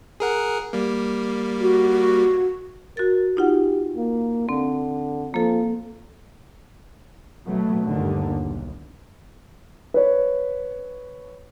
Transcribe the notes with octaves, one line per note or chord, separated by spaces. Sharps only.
G#4 A#4 F#5
G3 A#3
F#4
F#4 A#4 A6
D#4 F4 G4 F#5
A#3
D3 C4
F3 A#3 A4
B2 F#3 A3
G1 D#2 D3
B1
B4 C#5